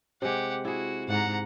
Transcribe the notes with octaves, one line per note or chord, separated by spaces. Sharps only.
C3 G#3 G4 F#5
E4 F#4 G#4
G#2 F#5 A#5